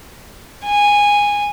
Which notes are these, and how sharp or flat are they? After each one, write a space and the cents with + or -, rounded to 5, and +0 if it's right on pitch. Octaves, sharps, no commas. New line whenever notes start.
G#5 -15